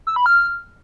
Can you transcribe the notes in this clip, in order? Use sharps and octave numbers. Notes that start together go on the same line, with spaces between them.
E6
B5
F6